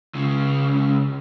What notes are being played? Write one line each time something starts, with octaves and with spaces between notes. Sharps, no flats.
C#2 C#3